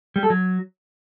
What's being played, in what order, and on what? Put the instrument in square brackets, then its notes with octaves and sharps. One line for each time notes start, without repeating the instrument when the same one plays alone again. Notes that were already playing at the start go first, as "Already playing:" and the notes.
[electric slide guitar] G3
A4
F#3